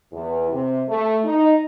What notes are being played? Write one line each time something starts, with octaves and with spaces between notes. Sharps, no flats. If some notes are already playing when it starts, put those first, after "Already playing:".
E2
C3
A3
D#4